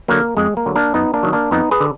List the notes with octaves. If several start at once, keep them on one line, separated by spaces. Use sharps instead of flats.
D3 F#3 A#3
F2 G#3
A#3
D3 F#3
A#3 D4
F#2 B3 D#4
A#3 D4
D#3 F#3
A#3 D4
F2 B3 D#4
G#4 B4
D3